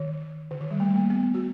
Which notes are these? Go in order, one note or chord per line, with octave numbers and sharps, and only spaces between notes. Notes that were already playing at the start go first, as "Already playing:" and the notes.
Already playing: D#3
D3
D#3
G3
A3
A#3
B3
F#4